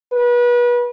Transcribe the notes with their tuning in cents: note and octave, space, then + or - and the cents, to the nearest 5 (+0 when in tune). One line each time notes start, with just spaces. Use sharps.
B4 -30